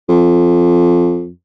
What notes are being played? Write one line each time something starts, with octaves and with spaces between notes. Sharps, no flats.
F2